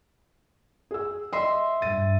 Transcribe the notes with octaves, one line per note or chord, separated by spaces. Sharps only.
G#4 E6
D#5 E5 C6
G2 A6 D#7